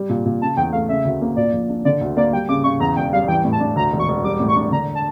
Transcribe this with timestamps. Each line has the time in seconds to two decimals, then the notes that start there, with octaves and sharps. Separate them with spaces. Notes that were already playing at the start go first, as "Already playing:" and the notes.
Already playing: G3
0.09 A#2
0.25 A#2
0.42 C#3 A5
0.57 E2 G5
0.73 A3 F5
0.89 C#3 E5
1.05 D2
1.22 A#3
1.36 A#2 D5
1.53 A#1
1.69 D4
1.85 D3 D5
2.01 D2
2.17 A#3 D5
2.32 G3 G5
2.49 C#3 D6
2.64 C#3 C#6
2.80 E2 A#5
2.96 E1 G5
3.13 G3 F5
3.28 E3 G5
3.45 A2
3.52 A5
3.60 D4
3.76 D2 A#5
3.93 E1
3.99 C#6
4.08 E1
4.24 G3 D6
4.40 A2
4.48 C#6
4.56 D4
4.71 D3 A#5
4.95 A5